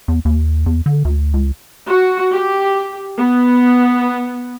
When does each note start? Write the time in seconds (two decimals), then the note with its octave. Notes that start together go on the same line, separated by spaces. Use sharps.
0.08 E2
0.25 D#2
0.66 E2
0.86 D3
1.05 D2
1.34 C#2
1.86 F#4
2.32 G4
3.18 B3